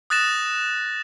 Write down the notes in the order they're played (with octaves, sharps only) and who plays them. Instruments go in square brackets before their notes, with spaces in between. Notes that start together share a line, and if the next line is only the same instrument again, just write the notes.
[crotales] D#6 F#6 A6 A#6 E7